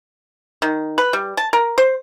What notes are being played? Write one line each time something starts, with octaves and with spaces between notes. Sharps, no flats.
D#3
B4
G3
A5
A#4
C5